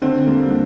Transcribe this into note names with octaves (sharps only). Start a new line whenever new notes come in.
D3 C4
G3 A#3
D3